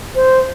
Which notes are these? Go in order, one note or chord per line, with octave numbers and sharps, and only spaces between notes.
C5